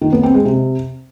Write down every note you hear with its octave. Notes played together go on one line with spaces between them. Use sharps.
D#3
B3
C4
G#3
C3